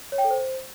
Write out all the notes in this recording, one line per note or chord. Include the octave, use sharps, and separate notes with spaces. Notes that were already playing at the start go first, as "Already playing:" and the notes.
C#5
G5
A4
C5